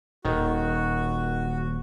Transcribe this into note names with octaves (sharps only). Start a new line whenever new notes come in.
D#1 D#3 F#4